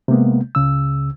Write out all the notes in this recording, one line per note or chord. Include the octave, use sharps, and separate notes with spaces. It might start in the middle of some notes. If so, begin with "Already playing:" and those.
C3 G#3 A#3 B3
C#2 C#3 E6